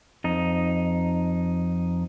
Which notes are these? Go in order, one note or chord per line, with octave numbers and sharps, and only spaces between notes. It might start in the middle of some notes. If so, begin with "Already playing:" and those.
F2 D#4